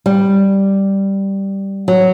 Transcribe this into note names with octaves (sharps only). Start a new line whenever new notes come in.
G3
F#3